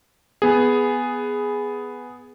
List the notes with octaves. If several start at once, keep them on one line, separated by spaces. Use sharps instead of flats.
B3 G#4